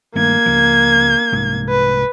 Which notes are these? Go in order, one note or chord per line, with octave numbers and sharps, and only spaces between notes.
G2 D#3 A3 A#3 G#6
C#2 F3
C2 G#2
B4